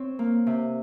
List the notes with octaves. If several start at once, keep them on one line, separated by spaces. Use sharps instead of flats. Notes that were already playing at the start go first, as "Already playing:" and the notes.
Already playing: C4 C#5
A#3
C3